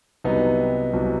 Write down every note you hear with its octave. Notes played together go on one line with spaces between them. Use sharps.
C2 C3 F#3 B3 D#4
C2 C3 F#3